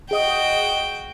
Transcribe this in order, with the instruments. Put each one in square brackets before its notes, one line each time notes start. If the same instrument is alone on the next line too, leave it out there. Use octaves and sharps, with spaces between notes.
[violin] F#4 G5 [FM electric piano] G#4 D#5 D#6